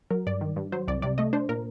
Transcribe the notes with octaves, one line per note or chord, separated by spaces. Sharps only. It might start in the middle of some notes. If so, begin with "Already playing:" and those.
F#3 A#4
G2 D5
D#3
G2
F#3 C5
C2 D5
C3 D5
A3 D#5
D4 C5
A#2 A#4